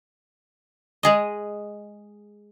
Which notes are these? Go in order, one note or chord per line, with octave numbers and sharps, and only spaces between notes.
G#3 G#4 D#5